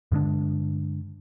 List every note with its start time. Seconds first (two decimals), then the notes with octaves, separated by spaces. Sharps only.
0.12 G2 D3 G#3 D4